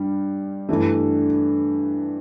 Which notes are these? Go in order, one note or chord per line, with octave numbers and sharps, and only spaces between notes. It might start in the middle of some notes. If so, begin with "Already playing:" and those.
Already playing: G2 G3
G2 E3 A3